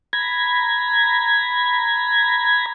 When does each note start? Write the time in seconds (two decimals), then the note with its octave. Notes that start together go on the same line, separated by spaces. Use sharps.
0.13 A#5 B5 G#6